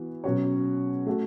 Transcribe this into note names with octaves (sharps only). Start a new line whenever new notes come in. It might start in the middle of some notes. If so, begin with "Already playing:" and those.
Already playing: E3 B3 F#4
B2 F#3 C#4 F#4 C#5
A3 F#4